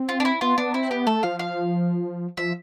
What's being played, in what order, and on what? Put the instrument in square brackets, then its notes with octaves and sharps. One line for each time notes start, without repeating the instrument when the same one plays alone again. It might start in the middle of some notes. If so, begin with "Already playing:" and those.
Already playing: [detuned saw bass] C4
[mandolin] F4
D4
E4
[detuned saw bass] B3 [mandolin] F4
[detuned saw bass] B3 [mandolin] D4
[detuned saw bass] C4 [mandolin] E4
[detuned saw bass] B3 [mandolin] G4
[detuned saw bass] A3 [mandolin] A4
[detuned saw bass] F3 [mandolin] F5
[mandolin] F5
[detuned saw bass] F3 [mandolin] E5